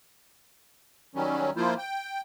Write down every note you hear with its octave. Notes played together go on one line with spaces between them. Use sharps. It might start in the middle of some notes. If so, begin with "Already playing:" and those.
D#3 F#3 G3 C#4
F3 A#3 E4 F4 C5
G5